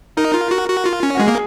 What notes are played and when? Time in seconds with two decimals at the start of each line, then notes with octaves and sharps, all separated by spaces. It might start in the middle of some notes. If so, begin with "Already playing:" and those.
0.17 D#4 A#4
0.34 F4
0.51 F#4
0.69 F#4
0.86 F4
1.03 C#4
1.15 F#4
1.20 G#3 G#4
1.28 A#3